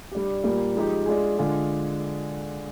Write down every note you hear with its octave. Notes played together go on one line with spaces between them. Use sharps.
G3 D4 G4
A#2 G3 A#3
F3 G#3 D#4 G4
G#3 D4 F4 G#4
D3 G#3 D4 F4 G#4